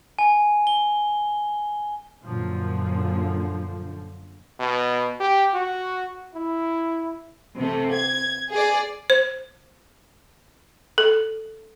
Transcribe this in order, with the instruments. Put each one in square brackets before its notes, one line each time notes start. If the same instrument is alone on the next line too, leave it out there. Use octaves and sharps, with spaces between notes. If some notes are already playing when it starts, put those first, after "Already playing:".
[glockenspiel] G#5
G7
[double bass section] F#2 A#2 D3 F3
[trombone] B2
G4
F#4
E4
[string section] C3 A3
G#6
G#4 D5
[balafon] C5
A4